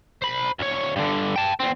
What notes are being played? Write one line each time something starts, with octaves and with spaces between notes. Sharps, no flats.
C5 B5
D2 C#5
G2 D3
G5 A5
E2 C4